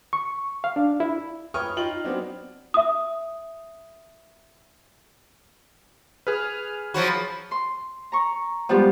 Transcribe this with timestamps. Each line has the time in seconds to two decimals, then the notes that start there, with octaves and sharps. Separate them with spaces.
0.13 C#6
0.64 F5
0.76 D4
1.00 E4
1.54 B4 C#5 G5 C#6 D#6 F6
1.77 D#4 F4 G5 F#7
2.04 F#3 B3 C4 D4
2.74 E5 D#6
6.27 G#4 B4 F6
6.94 F3 F#3 F#4 B5
7.51 C6
8.12 A#5 C#6
8.69 F3 G3 G#3 B3 G4